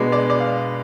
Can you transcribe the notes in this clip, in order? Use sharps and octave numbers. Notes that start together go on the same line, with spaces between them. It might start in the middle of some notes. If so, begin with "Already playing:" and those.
Already playing: B2 G#3 B3 D4
D5
D5
F5